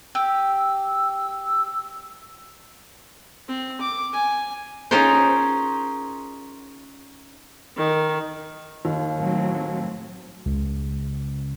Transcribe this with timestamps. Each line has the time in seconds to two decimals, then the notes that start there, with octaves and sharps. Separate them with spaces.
0.15 G4 E6
3.48 C4
3.81 D6
4.13 G#5
4.91 C#4 D#4 F4 G#4 A#4 C5
7.77 D#3
8.85 D#2
9.17 A2 F#3 C4
10.46 C#2